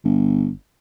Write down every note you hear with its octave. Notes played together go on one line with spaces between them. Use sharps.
G1